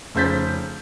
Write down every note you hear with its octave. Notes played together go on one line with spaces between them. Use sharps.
F1 C#3 C5 G6 A6 B6